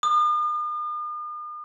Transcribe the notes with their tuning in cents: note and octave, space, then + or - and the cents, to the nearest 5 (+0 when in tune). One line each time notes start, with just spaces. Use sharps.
D#6 -45